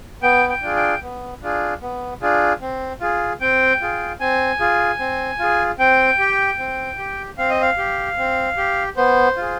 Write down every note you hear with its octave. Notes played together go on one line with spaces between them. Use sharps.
B3 G5
G5
D4 F4 G#4
G5
B3
D4 F4 G#4
B3
D4 F4 G#4
C4
F4 G#4
C4 G5
F4 G#4
C4 G#5
F4 G#4
C4
F4 G#4
C4 G5
G4
C4
G4
C4 F5
D#5
F5
G4
C4
G4
B3 C5
F4 G#4